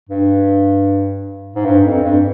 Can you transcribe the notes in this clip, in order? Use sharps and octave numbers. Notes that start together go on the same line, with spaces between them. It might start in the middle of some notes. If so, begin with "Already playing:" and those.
G2
G#2
G2
F2
G2